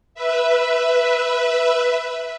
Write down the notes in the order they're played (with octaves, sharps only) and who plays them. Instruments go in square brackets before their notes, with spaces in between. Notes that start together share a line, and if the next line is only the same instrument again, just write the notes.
[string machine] B4 E5